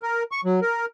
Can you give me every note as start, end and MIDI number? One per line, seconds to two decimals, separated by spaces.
0.03 0.23 70
0.32 0.41 85
0.45 0.60 54
0.62 0.86 70